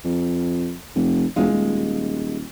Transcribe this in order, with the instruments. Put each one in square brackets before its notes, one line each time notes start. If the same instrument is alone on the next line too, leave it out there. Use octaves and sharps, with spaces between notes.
[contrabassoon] F2
F1
[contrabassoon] E1 [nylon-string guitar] G#3 F4
[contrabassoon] D#1